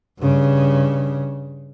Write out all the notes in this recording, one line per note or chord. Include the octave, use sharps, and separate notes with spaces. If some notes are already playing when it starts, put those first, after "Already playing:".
G2 C#3